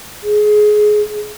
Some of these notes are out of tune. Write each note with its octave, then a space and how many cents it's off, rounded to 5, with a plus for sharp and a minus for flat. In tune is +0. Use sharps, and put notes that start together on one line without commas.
G#4 +20